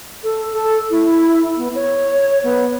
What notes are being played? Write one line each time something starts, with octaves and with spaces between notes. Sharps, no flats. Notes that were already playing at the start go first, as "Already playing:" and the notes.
A4
A4
E4
B3
C#5
B3